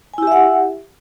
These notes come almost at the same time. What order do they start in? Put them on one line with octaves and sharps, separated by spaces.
G#5 E4 G4 E5 F#5